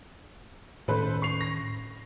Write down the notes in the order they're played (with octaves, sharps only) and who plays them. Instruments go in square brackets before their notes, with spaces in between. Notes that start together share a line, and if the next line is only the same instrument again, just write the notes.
[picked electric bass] A2 D#3 C#4 [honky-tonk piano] A4 B4 C5
[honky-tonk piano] C#6 C7 F7
A#6